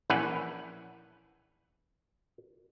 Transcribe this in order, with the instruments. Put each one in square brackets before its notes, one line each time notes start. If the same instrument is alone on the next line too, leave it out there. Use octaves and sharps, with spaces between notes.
[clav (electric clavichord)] A#1 E3 C#4 B4 F#5